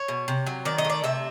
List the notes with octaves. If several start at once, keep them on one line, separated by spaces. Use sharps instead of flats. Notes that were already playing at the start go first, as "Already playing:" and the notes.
Already playing: C#5
B2
C3
F#3
D#3 D5
D#5
A3
D5
C3 E5